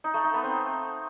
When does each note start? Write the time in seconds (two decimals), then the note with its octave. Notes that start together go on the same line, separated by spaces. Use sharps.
0.04 D#4
0.14 A3
0.24 D#4
0.34 B3
0.44 C4